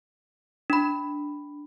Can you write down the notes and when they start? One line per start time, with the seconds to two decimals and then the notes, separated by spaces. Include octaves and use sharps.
0.70 D4 B5